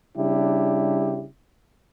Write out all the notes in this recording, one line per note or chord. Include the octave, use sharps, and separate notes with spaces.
C#3 G3 D4 E4 G4